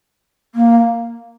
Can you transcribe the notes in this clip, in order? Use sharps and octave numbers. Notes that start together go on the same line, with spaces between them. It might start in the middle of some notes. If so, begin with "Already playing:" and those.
A#3